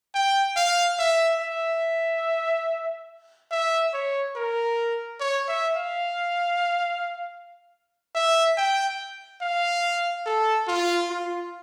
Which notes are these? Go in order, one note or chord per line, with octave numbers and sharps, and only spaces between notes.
G5
F5
E5
E5
E5
C#5
A#4
C#5
E5
F5
E5
G5
F5
A4
F4
F4